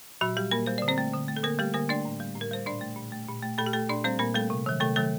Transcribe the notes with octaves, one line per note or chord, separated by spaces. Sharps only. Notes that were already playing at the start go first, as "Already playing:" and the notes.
A#2 F#3 F#4
G3 G4
A#2 A#3 A#4
G3 C5
D3 D5
C4 C5
A3
D3
A3
A4
D3 A#3 A#4
G3 A3 G4
D3 A#3 A#4
A3 D4 D5
A2
G3
A2
A#4
G3 C5
A#2 D4 D5
A3
A#2
A3
A#2
A3
A#2 A3 A4
G4
A3 A4
A#2 D4 D5
G3 C4 C5
A#2 A#3 A#4
G3 A3 A4
C3
D#3 F#3
C3 A3 A4
D#3 F#3 A3 A4